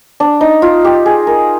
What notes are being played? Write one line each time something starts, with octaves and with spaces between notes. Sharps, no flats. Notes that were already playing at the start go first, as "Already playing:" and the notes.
D4
D#4
F4
G4
G#4
A#4